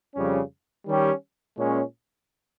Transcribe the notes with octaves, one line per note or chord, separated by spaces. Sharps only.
F2 C#3 G3 C#4
D#3 G3 C#4 G4
A#2 G#3 C#4